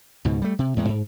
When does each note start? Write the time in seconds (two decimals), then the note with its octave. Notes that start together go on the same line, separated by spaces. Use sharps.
0.25 C#2 G#2 B2
0.42 G3 A3
0.59 C3
0.76 E2 A2 G#3
0.89 G#2